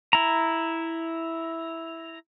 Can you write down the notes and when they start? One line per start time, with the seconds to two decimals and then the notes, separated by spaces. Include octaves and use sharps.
0.13 E4 A#5